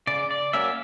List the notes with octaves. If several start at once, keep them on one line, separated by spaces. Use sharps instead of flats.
C#3 D5
D5
F#3 A#3 C#4 E5